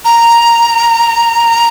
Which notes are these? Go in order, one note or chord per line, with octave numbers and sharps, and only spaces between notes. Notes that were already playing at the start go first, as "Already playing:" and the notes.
A#5